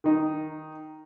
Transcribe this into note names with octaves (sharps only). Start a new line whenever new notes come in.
D#3 D#4